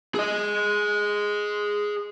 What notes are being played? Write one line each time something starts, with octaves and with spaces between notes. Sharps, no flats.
G#4 D#5